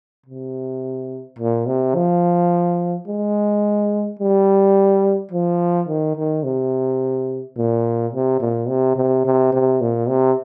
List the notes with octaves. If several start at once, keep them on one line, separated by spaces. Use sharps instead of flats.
C3
A#2
C3
F3
G#3
G3
F3
D#3
D#3
C3
A#2
C3
A#2
C3
C3
C3
C3
A#2
C3